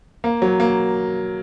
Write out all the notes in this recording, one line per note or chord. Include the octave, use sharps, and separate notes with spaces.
A#3
F#3
A#3